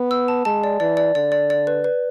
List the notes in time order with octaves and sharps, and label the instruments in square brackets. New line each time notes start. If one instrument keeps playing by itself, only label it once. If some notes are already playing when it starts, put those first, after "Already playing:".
Already playing: [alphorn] B3
[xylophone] E6
A5
[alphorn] G#3 [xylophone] A5
[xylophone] D5
[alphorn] E3 [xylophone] D5
[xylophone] D5
[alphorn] D3 [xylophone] D5
[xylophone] D5
D5
B4
B4